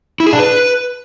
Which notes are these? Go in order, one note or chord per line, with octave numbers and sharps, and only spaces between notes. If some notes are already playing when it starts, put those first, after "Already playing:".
E4
G#4
D4
B4